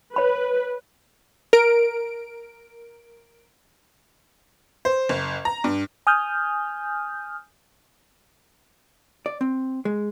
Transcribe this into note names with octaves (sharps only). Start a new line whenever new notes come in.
B4 C#5 B5
A#4 D7
C5
F#1
A#5
G2
G#5 D#6 F6 G6
D5
C4
G#3